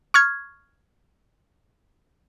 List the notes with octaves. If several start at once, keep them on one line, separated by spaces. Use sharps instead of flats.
C#6 F6 G#6